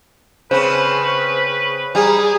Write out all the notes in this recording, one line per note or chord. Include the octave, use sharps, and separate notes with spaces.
C#3 C4 B4 C5
G3 G#4 A#5